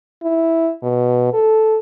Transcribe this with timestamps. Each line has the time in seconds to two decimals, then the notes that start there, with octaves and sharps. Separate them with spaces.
0.23 E4
0.83 B2
1.33 A4